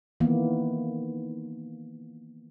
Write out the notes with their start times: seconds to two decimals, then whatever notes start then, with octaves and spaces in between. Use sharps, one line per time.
0.20 D#3 E3 A#3 B3